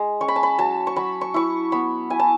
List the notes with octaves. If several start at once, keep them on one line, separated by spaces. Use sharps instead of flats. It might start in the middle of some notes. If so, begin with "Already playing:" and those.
Already playing: G#3
C#4 C#6
B5
A5
B5
F#3 A5
C#6
F#3 B5
C#6
E4 C#6
B3 B5
E4 G#5
A5